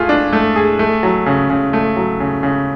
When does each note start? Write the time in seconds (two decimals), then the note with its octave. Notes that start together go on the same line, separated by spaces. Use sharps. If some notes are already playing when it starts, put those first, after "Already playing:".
Already playing: A3 F4 G#4
0.09 D4
0.33 A3
0.56 G#4
0.79 A3
1.03 F#3
1.26 C#3
1.50 C#3
1.73 A3
1.96 F#3
2.20 C#3
2.43 C#3